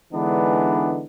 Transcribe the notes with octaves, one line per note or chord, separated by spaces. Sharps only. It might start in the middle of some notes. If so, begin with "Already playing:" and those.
D3 E3 G#3 B3 D4 D#4